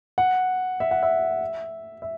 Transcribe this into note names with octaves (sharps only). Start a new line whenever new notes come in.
F#5
E5
F#5
E5
E5